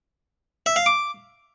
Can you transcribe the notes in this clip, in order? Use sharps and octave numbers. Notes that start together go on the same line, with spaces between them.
E5
F5
D6